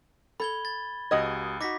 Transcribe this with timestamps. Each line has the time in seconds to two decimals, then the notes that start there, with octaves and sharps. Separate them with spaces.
0.40 A4 B5 G#6 G7
0.65 A6
1.11 C#2 F#4 G4 D#5 D#6 G#6
1.61 D#4 F#4 D6 A#6 B6